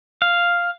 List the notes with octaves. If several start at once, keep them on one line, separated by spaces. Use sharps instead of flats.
F5